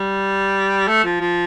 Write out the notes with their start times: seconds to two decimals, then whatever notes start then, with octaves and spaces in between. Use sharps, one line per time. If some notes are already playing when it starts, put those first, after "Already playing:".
Already playing: G3
0.88 A3
1.04 F3
1.21 F3